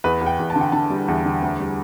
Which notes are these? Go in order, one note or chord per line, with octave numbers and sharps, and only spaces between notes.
E2 B4
E2
G5
E2
A5
D3
G5
D3 A5
G3
E2
D3
D2
G3